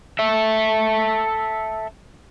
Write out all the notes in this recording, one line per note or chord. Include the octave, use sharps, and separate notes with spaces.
A4 E5